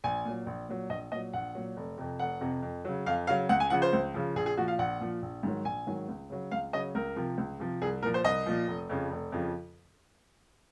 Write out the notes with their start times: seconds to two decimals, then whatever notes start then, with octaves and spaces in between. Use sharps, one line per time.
0.04 A#1 G#5
0.25 A#2 F#3
0.46 A#1
0.69 A#2 F#3
0.90 A#1 D#5
1.12 A#2 F#3 D#5
1.33 A#1 F#5
1.55 A#2 F#3
1.77 F1
1.98 F2 C3
2.19 F1 F#5
2.41 F2 C3
2.62 F2
2.85 C#3 F#3
3.06 F2 F5
3.27 C#3 F#3 F5
3.49 C#2 F#5
3.60 G#5
3.70 C#3 F3 F#5
3.82 C5
3.93 C#2
4.14 C#3 F3
4.36 A#1 G#4
4.46 G#4
4.57 A#2 F3 F#4
4.68 F5
4.79 A#1 F#5
5.01 A#2 F3
5.22 A#1
5.43 G#2 D#3 F#3
5.65 A#1 G#5
5.87 G#2 D#3 F#3
6.09 C#2
6.30 C#3 F#3
6.52 C#2 F5
6.73 C#3 F#3 D#5
6.95 C#2 A#4
7.16 C3 F3
7.38 C#2
7.60 C3 F3
7.82 C2 G#4
8.03 A#2 F3 A#4
8.14 C5
8.24 C2 D#5
8.46 A#2 F3
8.68 F1
8.89 F2 C#3 F3
9.10 F1
9.32 F2 C#3 F3